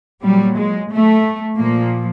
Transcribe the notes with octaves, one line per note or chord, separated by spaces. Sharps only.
A#2 F#3 G3
G#3
A3
A#2 F3 A#3